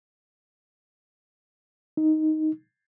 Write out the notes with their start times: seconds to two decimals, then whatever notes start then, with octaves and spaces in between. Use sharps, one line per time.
1.97 D#4